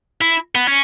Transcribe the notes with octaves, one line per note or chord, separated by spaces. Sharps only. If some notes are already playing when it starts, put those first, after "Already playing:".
E4
B3
C#4